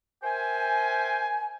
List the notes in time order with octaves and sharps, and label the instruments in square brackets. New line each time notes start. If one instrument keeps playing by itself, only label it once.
[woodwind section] A#4 C5 E5 G5 G#5